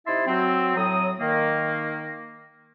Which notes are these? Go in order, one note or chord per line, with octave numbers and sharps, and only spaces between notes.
C3 D#4 E4 E5 A5 C6
F#3 C4
A2 F#3 D#6
D#3 A#3